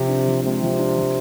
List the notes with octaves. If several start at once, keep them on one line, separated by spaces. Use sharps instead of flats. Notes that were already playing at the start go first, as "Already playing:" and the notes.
Already playing: C3 F3
D4
F3
C3 G#3
F3
D4
F3